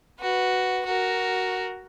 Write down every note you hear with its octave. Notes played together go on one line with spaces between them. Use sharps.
F#4 B4
F#4 A#4